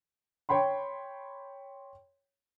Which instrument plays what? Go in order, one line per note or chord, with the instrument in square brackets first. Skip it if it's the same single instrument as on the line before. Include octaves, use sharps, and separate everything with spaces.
[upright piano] C#5 G5 B5 C6